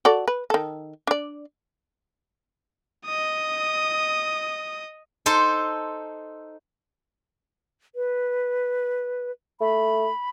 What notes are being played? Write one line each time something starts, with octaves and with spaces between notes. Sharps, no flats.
F#4 A4 D5
B4
D#3 A4
D4 D5
D#5 D#6
D#4 A4 C5
B4
A3 B5